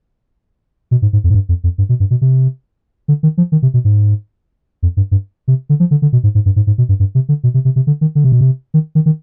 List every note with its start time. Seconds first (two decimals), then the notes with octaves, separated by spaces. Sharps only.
0.91 B2
1.02 G#2
1.13 G#2
1.24 F2
1.30 G#2
1.34 G2
1.49 F2
1.64 F2
1.78 G2
1.89 B2
2.00 G2
2.11 B2
2.21 C3
3.08 D3
3.23 D#3
3.38 F3
3.52 D#3
3.62 C3
3.74 B2
3.85 G#2
4.83 F2
4.97 G2
5.11 G2
5.48 C3
5.69 D3
5.80 F3
5.91 D3
6.02 D3
6.13 B2
6.23 G#2
6.35 G#2
6.46 G2
6.56 G#2
6.67 G#2
6.78 B2
6.89 G2
7.00 G2
7.15 C3
7.29 D3
7.44 B2
7.54 C3
7.65 C3
7.76 C3
7.87 D3
8.01 D#3
8.15 D3
8.24 C3
8.32 B2
8.41 C3
8.74 D#3
8.95 D#3
9.06 D#3